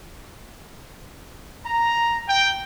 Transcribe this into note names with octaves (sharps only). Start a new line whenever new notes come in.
A#5
G5